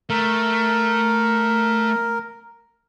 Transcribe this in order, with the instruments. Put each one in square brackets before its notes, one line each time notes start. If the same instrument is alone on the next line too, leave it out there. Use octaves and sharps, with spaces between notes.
[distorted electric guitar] A3 [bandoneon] A#4